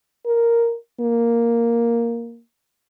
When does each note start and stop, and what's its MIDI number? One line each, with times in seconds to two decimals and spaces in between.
0.26 0.75 70
1.01 2.41 58